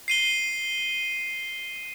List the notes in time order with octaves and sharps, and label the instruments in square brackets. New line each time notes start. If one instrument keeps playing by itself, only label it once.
[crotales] C7 D#7 G7